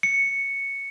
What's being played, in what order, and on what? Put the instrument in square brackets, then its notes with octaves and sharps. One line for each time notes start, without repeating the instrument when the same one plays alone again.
[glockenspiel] C#7